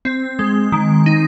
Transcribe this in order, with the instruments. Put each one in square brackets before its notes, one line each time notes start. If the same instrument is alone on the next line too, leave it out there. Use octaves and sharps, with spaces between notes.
[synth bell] C4
G#3
D#3
D#4